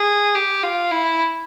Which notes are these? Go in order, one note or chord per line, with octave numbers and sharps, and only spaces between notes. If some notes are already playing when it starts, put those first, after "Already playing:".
Already playing: G#4
G4
F4
E4